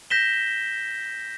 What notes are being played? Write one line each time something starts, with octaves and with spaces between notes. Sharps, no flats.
G6 A#6 B6 E7 G7